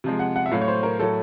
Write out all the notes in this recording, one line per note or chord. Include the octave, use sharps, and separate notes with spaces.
C3 F3 G#3
F#5
F#5
E5
A2 F#3 A3 F5
C#5
C5
A#4
A2 F#3 A3 A4